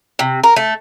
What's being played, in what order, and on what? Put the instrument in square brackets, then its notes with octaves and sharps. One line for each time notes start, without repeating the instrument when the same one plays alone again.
[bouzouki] C3
A#4
A3